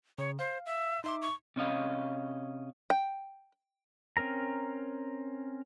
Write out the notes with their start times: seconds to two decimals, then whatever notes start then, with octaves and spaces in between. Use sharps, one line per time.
0.18 C#3 C#5
0.39 C5 F5
0.66 E5
1.04 D#4 E5 C6 D6
1.22 C#6
1.56 C3 C#4 D#5 F5
2.90 G5
4.17 C4 C#4 A#4 A#5